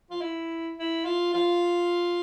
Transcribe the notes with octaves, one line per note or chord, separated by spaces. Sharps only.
F4
E4
E4
F4
F4